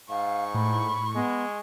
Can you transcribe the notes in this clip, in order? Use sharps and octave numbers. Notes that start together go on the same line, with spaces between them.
G#2 F5 C#6
A2 B5
G#3 B3